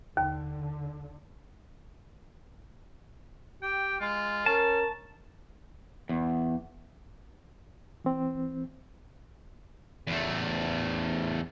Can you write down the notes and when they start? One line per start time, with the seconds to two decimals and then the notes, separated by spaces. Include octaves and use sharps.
0.17 D#2 D3
3.63 G4 G5
4.01 G#3 F4
4.46 C#4 A#4 A5
6.09 E2
8.05 E3 C4
10.07 E2 A3